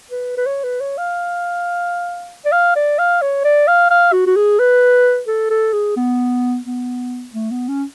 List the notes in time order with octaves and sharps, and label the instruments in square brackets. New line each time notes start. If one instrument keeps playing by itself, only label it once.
[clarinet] B4
B4
C#5
B4
C#5
F5
D5
F5
D5
F5
C#5
D5
F5
F5
F#4
F#4
G#4
B4
A4
A4
G#4
B3
B3
A3
B3
C#4